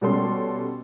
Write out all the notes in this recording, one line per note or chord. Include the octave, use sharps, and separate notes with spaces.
B2 G3 C#4 A4 C6